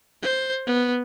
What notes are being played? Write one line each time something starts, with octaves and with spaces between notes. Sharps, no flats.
C5
B3